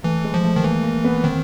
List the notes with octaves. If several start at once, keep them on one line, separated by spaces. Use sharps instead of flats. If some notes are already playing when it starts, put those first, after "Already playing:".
E3 A3
G#3
F3
A3
D#3
E3 A#3
A#3
B3
D#3 C4